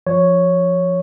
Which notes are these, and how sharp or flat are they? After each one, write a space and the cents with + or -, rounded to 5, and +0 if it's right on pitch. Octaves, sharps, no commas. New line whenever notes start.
F3 +0 C#5 +0